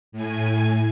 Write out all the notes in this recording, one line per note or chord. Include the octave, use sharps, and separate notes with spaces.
A2 G#5